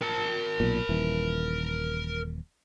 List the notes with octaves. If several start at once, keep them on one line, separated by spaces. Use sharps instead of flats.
A#4 A5
B1 A#2
D#1 E3